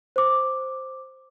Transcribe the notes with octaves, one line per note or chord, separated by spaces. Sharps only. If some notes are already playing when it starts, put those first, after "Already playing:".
C5 D6